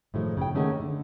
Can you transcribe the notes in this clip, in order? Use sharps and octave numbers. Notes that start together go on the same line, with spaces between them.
A2 D#3 F3 G#3 A3
C#3 C#4 G5
D#3 A3 C#4 G#4 A#4 F#5
D3